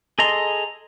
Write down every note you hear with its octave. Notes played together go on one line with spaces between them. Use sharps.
G#4 A4 D#5 A#5 C6